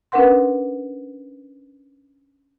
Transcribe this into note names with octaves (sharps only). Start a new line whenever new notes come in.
C#4 D4 A#4 B4 F#5 C6